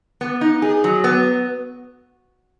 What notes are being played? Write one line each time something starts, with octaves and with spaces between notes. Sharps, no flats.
B3
D#4
G#4
F#3
B3